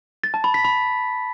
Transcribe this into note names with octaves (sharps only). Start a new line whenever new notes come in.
A6
A5
B5
B6
B5